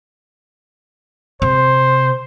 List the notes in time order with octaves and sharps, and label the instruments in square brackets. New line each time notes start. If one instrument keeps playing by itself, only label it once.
[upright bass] C3 [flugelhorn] C5